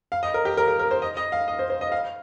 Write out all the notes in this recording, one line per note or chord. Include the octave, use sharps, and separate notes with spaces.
F5
D#5
A#4
G4
A#4
A#4
A#4
C5
D#5
D#5
F5
D#5
C5
C5
D#5
F5